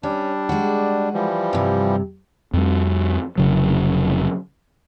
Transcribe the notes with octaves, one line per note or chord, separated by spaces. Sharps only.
G3 C#4 D4
G#3 F#4
E3 F3 G3
G2 C3
F2 G3
F1 C#3 F#3